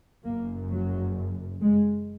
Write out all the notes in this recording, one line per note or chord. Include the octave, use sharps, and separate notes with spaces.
F#1 F#2 A#3
F#3
G#3